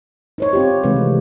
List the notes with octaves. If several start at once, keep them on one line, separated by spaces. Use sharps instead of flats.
D#4 C5 C#5
C4 F4 G4
C3 D#3 E3 G#3 A3 B4